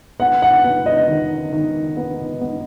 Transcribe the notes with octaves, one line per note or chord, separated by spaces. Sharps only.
B3 F#5
F#5
B3
D#5
D#3
D#3
B3
B3